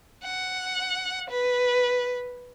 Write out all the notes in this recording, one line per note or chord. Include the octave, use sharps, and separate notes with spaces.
F#5
B4